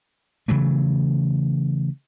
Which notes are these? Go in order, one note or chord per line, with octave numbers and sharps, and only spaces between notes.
C#3 E3 F#3 A3